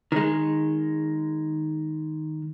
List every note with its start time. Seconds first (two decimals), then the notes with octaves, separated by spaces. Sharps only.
0.12 D#3 G#3